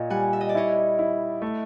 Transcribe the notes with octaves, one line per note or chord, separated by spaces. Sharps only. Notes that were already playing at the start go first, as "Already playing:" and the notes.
Already playing: A#2 C#5 D#5
G3 F#5 G#5
E5
D#5
D5
E4 C#5 D#5
E4
A3